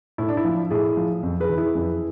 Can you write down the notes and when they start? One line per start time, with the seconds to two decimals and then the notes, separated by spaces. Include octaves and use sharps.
0.18 A2 E4
0.28 D4
0.37 E4
0.45 F3
0.70 A2 E4 G#4
0.97 F3
1.23 F2
1.40 G#4 B4
1.49 E3
1.58 E4 G#4
1.75 F2